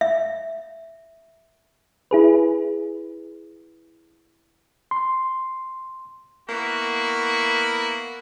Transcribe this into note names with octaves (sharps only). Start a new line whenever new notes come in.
E5
E4 G#4 B4
C6
A#3 B3 E4 F#4